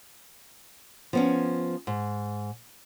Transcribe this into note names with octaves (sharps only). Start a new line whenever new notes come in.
F3 B3 C#4
G#2